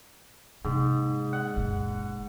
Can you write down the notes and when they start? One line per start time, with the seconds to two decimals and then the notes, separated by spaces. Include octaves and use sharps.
0.65 G#2 C3 A#3
1.33 F#5
1.56 F#1 A#2